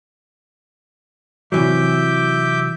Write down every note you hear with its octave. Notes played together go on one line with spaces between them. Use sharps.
C3 E3 F#3 E5 D6 G6